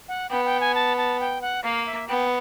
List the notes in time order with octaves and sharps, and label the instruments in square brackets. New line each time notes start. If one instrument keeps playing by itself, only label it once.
[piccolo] F#5
[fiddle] B3 [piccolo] G5
[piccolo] G5
G#5
A5
A5
G5
F#5
[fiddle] A#3 [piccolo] F5
[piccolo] E5
[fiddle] B3 [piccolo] G5